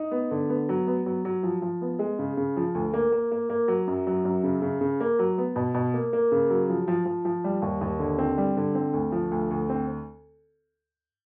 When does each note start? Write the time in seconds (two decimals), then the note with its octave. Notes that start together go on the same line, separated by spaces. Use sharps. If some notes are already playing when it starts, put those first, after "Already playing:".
Already playing: D#4
0.11 B3
0.31 D3
0.49 B3
0.69 F#3
0.87 B3
1.06 F#3
1.25 F#3
1.43 F3
1.62 F3
1.82 B3
1.99 G#3
2.19 C#3
2.37 C#3
2.57 F3
2.75 D2
2.94 A#3
3.12 A#3
3.32 A#3
3.50 A#3
3.68 F#3
3.87 F#2
4.07 F#3
4.25 F#2
4.44 C#3
4.62 C#3
4.81 C#3
5.00 A#3
5.19 F#3
5.38 B3
5.56 B2
5.74 B2
5.94 A#3
6.13 A#3
6.32 C#3
6.50 F#3
6.69 F3
6.88 F3
7.06 F3
7.25 F3
7.44 G3
7.62 D#2
7.81 D#2
7.99 D3
8.18 C4
8.38 G3
8.57 D3
8.75 C4
8.93 D2
9.12 F3
9.31 D2
9.51 D2
9.70 C4